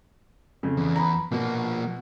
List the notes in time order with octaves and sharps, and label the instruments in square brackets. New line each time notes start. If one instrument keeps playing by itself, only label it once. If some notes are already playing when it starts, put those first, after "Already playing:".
[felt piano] F2 C#3
[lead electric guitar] E2
[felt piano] A#5 B5
[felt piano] B2 [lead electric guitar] F3 A#3